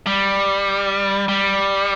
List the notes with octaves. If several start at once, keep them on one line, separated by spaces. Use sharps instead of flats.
G3
G3